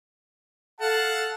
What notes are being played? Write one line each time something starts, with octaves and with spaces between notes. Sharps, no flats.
A4 F5 F#5 A5